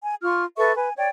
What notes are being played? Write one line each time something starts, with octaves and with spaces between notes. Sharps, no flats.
G#5
F4 C6 C#6 F6
A4 B4 E5 C#6
B4 G#5
C#5 D5 G5